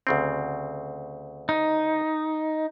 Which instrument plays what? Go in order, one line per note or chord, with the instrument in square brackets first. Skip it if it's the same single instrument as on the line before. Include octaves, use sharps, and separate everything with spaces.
[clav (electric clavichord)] D2 C#3 C4
[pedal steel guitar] D#4